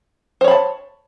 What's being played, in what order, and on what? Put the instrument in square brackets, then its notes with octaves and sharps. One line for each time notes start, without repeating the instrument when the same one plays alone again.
[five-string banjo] C5
C#5
B5
A5